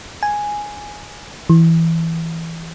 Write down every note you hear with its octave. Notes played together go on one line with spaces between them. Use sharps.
G#5
E3